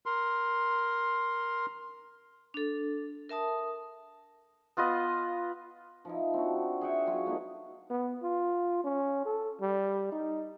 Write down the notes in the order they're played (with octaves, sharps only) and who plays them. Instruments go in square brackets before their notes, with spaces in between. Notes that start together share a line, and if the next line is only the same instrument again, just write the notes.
[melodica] A#4 C6
[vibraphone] D4 A4
A#4 E5 A5 D#6
[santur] B3 F4 B4 D#5
[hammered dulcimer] F3 D#4 E4
C4 D4 F#4
G#4 E5 F#5 G5
F#3 F4 C#5
A3 B3 D#4 E4
[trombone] B3
F4
C#4
A4
G3
D#4